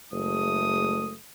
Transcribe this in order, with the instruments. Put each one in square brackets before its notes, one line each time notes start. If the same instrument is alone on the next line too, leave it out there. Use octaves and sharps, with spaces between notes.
[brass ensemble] F#1 G#3 A3 [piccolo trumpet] D#6